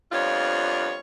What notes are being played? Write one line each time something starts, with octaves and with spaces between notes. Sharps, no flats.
F2 G3 B3 D4 F4 C#5